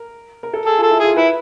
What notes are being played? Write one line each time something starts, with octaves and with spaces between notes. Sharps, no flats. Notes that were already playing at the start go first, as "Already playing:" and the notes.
Already playing: A#4
A#4
A4
G#4 A4
F4
A4
E4
F4 G#4
E4 B4